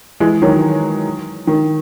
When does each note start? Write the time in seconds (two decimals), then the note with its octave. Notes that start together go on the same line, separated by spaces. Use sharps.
0.20 E3 G#3
0.42 D#3 F#3
1.47 D#3